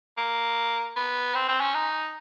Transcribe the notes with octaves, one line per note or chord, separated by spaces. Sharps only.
A#3
B3
C4
C4
C#4
D#4